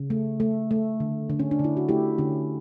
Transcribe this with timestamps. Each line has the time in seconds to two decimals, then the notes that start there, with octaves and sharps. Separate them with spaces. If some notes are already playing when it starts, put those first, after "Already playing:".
Already playing: C#3
0.10 A3
0.40 A3
0.71 A3
1.00 D3
1.30 D3
1.40 C#4
1.51 D4
1.59 D3 E4
1.77 F#4
1.89 A3 E4 G4
2.18 D3 C#4